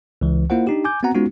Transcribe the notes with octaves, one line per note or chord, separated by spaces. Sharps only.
C#2 E3
A#3 E4 F4 C5 F#5
D4 D#4 G4
G#5 D6 G6
B3 C4 F#4 F#5 A#5
G#3 B3 C#4 D#4 F4 F#4